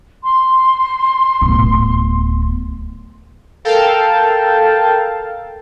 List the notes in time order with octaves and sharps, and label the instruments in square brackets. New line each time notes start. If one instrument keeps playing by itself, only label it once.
[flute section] C6
[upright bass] D1 B3
[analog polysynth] A4 A#4 F5 G5 A5